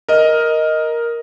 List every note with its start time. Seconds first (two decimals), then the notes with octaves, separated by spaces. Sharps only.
0.09 A#4 D#5